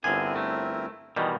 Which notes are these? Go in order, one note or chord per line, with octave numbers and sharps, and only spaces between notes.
G1 D3 C4 E4 G#4 A#4 G#5
A3
B2 D#3 E3 G3